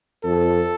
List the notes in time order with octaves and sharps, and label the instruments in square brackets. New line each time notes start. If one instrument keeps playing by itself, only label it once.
[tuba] F2 [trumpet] A4